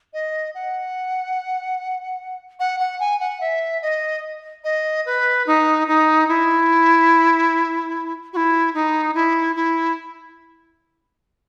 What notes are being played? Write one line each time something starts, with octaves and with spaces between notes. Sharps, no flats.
D#5
F#5
F#5
F#5
G#5
F#5
E5
D#5
D#5
B4
D#4
D#4
E4
F#4
E4
D#4
E4
E4